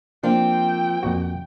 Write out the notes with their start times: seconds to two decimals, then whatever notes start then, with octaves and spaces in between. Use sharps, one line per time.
0.23 F3 A#3 C4 D4 G5
1.03 F2 A#2 F#4